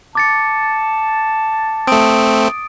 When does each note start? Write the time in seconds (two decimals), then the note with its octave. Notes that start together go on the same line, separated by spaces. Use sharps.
0.15 A5 D6 A6 C#7
1.88 A3 C4 D#6 D7